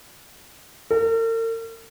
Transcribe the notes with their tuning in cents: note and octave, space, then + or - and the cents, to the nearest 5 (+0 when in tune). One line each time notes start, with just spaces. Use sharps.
A#4 -45